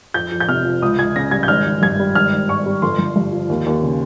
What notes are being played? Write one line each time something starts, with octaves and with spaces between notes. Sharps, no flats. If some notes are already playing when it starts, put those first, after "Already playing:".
F2 G6
F2
G6
C3 F6
F3
C#2 D#6
C#2 G#6
C#3 A#6
G3 G#6
G6
G#1 F6
G#1
G2 G#6
G3
G#1 F6
G#1
G#2 C#6
G3
G1 C6
G1
G2
F3
D#2
D#2
C#3